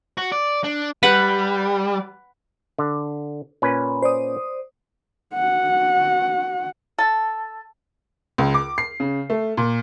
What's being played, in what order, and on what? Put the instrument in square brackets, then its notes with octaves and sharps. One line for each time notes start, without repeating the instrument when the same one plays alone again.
[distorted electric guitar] F#4
D5
D4
[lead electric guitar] G3 [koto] B4 F#5
[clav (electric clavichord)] D3
A#2 C#4 B4
[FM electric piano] C5 D5 D#6
[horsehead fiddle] F#4 F#5
[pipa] A4
[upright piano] C#2
D6
C7
C#3
A3
A#2